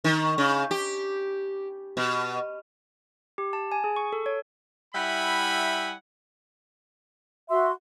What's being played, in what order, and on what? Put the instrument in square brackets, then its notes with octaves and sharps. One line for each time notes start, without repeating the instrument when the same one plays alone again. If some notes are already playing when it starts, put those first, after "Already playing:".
[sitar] D#3
C#3
G4
B2
[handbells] G4
A5
G#5
G#4
C#6
A4
C#5
[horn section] G3 E4 E5 F#5 G#5 B5
[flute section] F#4 C6 [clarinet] E5